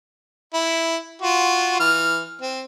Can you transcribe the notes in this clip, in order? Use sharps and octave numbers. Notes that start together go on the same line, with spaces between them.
E4
F4 F#4
E3 F6
C4